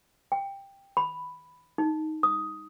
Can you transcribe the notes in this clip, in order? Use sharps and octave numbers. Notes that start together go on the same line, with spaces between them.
G5
B5
D#4
D#6